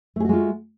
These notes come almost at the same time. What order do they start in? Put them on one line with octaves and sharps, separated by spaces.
A3 G#4 F#4 G#3 F4